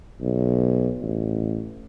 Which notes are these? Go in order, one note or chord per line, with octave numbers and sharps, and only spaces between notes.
B1
A1